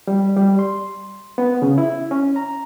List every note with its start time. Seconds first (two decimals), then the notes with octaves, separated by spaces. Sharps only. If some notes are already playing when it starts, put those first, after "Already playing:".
0.07 G3
0.37 G3
0.59 C6
1.38 B3
1.62 C#3
1.78 E4
2.11 C#4
2.36 A#5